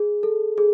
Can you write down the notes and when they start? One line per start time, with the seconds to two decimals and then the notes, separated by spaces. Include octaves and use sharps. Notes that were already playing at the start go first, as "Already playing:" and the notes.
Already playing: G#4
0.23 A4
0.58 G#4